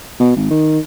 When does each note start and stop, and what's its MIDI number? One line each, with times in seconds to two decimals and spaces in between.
0.20 0.32 47
0.36 0.48 32
0.50 0.79 51